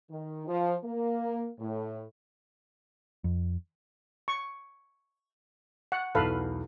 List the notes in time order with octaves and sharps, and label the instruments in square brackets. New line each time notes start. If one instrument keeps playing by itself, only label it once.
[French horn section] D#3
F3
A#3
A2
[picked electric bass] F2
[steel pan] C#6
F#5
[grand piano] B1 E2 [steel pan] A4 B4 F5